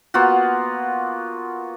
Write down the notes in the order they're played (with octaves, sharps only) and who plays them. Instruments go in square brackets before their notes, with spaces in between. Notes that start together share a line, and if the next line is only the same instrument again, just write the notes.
[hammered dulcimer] A#3 B3 F4 F#4